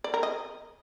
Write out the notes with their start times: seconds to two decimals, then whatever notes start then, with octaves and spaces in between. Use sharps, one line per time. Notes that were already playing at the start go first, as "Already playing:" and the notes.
0.04 D5
0.14 A#4
0.23 D#5